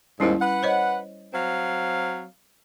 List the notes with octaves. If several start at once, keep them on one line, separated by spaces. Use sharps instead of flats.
D#2 G#2 G3 C#4 E4
B4 F#5
C5 C#5 D#5
F#3 C4 F5